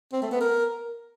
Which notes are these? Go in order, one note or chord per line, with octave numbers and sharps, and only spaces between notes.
C4
A3
B3
A#4